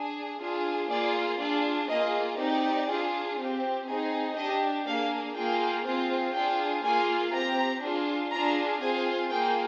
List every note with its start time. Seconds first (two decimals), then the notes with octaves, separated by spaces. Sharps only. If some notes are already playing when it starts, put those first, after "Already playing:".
Already playing: D4 G#4
0.40 D4 F4 G#4
0.90 A#3 F4 G#4 D5
1.40 D4 F4 G#4 D5
1.89 A#3 F4 G#4 D#5
2.38 C4 D#4 G4 D5
2.88 D4 F4 G#4
3.37 C4 G4
3.87 C4 D#4 G#4
4.36 D4 G4 D#5
4.86 A#3 D4 G#4 F5
5.35 A#3 F4 G#4 G5
5.85 C4 F4 G#4
6.34 D4 F4 G#4 G5
6.84 A#3 F4 G#4 G#5
7.33 C4 G4 A#5
7.82 D4 F4 G#4
8.32 D4 F4 G#4 A#5
8.81 C4 F4 G#4 G#5
9.31 A#3 F4 G#4 G5